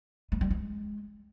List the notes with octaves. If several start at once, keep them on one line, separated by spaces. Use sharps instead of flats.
G#3
G3
G#3